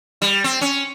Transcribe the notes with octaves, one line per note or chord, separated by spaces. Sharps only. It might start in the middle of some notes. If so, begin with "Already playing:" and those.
G3
C4
C#4